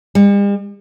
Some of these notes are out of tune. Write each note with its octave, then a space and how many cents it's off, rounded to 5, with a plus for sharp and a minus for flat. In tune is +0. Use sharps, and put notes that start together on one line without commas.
G3 +45